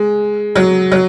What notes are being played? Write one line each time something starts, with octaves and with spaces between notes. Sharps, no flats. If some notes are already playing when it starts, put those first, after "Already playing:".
Already playing: G#3
F#3
F#3